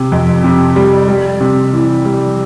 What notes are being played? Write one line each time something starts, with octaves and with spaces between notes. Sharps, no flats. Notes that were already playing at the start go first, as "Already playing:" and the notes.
Already playing: C3
F2
C3
G3
G3
C3
E3
G3